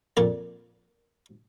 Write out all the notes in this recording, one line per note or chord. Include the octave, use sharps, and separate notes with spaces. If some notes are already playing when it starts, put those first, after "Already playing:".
F2 A#2 D5